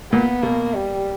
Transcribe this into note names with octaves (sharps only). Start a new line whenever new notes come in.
A#2 B3
B2 A#3
G3